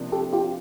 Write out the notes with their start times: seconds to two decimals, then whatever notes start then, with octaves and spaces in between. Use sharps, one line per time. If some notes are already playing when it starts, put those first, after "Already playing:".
Already playing: C3 F3 A#3 D4
0.12 G4 A4
0.33 F4 G4